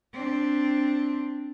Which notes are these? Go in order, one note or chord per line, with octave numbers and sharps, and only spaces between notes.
C4 D4